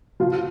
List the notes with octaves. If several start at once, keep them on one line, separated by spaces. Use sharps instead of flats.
F3 F4